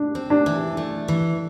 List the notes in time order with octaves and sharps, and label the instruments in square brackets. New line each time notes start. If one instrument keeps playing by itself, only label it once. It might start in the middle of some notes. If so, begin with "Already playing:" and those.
Already playing: [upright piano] D4
[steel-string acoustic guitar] C4
[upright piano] D4
[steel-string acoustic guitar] E3
A3
E3